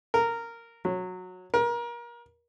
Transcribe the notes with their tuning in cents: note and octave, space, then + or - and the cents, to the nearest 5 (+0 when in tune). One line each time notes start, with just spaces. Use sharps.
A#4 -10
F#3 -15
A#4 +30